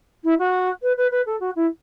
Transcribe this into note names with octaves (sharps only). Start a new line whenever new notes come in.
E4
F#4
B4
B4
B4
A4
F#4
E4